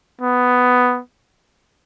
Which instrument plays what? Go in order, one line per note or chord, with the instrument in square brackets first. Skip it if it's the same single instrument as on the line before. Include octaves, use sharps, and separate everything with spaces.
[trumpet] B3